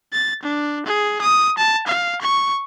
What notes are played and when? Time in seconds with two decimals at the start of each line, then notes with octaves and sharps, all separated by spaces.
0.13 A6
0.43 D4
0.86 G#4
1.21 D#6
1.58 A5
1.87 F5
2.22 C#6